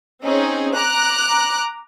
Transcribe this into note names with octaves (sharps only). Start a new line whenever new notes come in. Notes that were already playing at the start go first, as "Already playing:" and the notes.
C4 C#4 D#4 G#4
A#5 D6 F#6